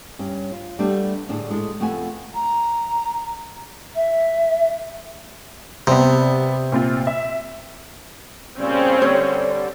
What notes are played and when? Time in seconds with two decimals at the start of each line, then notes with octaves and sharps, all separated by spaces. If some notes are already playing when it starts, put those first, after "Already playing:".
0.19 G2 C#4
0.52 F4
0.79 G3 A3 B3 D4
1.29 A2 D3 D4 G#4
1.50 G#3 A4
1.80 F2 A3 B3 F#5 G#5
2.35 A#5
3.95 E5
5.87 C3 G3 B3
6.72 A#2 C4 F4
7.07 E5
8.58 A#2 C#3 G3 C4 C#4
9.02 D3 G3 C#5